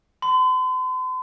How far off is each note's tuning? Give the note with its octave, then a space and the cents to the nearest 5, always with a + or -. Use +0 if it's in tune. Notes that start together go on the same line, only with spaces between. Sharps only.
C6 -45